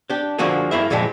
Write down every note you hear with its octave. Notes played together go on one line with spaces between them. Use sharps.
D4 G4
D3 F3 A#3 F#4 G#4
G2 A#3 E4 E5
A#2 E3 F3 G3 G#3